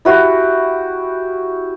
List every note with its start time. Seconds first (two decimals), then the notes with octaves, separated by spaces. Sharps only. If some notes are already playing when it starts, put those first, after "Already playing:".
0.05 E4 F#4 G4